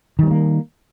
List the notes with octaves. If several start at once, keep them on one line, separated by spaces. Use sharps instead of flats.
D#3 G3 A#3 C4